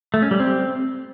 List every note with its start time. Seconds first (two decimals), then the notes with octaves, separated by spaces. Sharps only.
0.14 A3
0.22 C#4
0.31 G3
0.40 C4